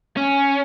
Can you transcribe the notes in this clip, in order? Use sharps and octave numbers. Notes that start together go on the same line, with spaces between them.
C#4